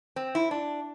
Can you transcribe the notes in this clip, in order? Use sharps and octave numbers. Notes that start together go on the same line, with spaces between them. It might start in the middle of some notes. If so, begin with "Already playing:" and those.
C4
E4
D4